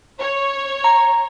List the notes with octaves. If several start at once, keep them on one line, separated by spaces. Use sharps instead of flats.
C#5
A#5